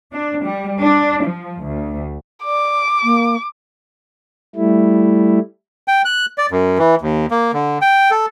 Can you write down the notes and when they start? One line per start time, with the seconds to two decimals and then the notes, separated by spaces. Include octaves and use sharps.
0.12 D4
0.41 G3
0.80 D4
1.23 F3
1.62 D2
2.44 D5 D6
3.03 A#3
4.56 G3 A3 E4
5.88 G5
6.05 F#6
6.38 D5
6.51 F#2
6.79 E3
7.01 D#2
7.31 A#3
7.54 D3
7.82 G5
8.11 A4